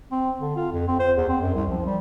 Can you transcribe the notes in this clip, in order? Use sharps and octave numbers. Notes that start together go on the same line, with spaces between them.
C4
D3
F4
F2
C4
C5
E2
C4
F#2
C2
F3
G3